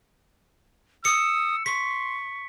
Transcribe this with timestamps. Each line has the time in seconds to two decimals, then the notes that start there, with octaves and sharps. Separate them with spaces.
1.05 D#6 E6 C#7
1.66 C6 C#6 B6